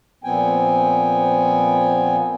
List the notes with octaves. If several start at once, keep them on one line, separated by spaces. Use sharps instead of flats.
A#2 F3 B3 C4 G5 G#5